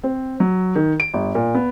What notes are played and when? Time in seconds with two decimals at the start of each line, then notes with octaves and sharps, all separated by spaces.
0.03 C4
0.40 F#3
0.76 D#3
1.00 D7
1.14 G1
1.35 A#2
1.55 B3